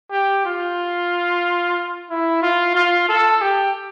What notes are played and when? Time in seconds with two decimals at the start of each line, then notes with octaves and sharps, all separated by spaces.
0.11 G4
0.45 F4
2.10 E4
2.42 F4
2.75 F4
3.08 A4
3.41 G4